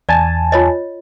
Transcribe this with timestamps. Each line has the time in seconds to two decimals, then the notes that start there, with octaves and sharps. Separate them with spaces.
0.09 E2 D5 G#5 A5
0.52 F4 C#5 D#5